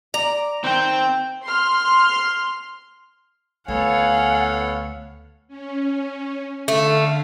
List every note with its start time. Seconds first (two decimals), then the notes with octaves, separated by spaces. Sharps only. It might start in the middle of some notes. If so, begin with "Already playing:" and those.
0.14 D5 A#5
0.64 D#3 C4 G5
1.45 C6 F6
3.68 D2 B3 A4 C#5 F5 F#5 G#5
5.48 C#4
6.68 D3 A3 F5